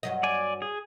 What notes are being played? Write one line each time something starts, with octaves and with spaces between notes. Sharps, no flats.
G2 F#3 D#5
D5 G#5
G#4